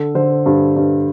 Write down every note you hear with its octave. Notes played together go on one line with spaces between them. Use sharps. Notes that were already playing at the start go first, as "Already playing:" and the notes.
Already playing: D3 A4
D3 C5
G2
G2